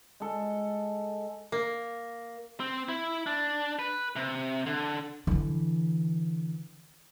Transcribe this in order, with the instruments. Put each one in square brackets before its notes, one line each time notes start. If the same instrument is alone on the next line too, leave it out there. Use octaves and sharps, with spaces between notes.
[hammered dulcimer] G#3 A4
[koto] A#3
[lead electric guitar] C4
E4
D4
B4
C3
D3
[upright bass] D3 E3